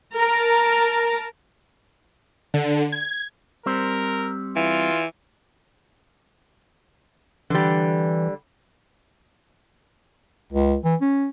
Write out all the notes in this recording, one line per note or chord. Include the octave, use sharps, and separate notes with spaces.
A#4 A5 A#5
D3
G#6
G3 C4 A#4 C5
E3 F4
D3 E3 G3
C#2
E3
C#4